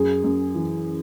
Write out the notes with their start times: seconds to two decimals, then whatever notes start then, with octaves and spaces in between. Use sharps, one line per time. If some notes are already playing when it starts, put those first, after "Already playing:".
Already playing: F#2 G#4
0.24 F#2
0.55 E3